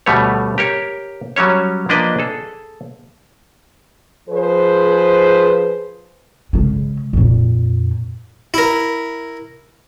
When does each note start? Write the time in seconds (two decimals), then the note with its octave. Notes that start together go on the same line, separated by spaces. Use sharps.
0.06 D2 B2 G3 A3 B4 C#5
0.58 G4 A#4 C#5
1.36 F#3 G3 C#4 C#5
1.89 F3 A#3 D4 A#4 B4 D#5
2.19 G#4 A4
4.29 F3 G#4 B4 C5
6.53 C#3 G#3
7.13 F2 A#2
8.54 E4 A#4